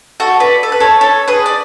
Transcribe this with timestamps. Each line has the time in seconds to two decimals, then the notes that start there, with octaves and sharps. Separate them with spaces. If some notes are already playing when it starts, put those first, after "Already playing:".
0.20 F#4 A4
0.40 B4 D5
0.63 A4
0.72 B4
0.80 A4 C#5
1.01 A4 C#5
1.28 G#4 B4
1.46 D5